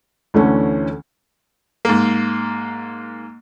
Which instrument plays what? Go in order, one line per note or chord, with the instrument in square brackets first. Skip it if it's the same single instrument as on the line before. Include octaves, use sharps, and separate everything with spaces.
[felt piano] D2 D3 E3 A3 C#4
[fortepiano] G#2 A#3